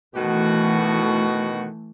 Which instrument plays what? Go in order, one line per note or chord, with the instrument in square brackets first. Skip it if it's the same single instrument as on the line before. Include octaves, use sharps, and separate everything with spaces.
[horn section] B2 D#3 F#4 [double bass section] E3 A3